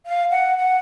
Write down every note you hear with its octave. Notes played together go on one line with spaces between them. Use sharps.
F5
F#5
F#5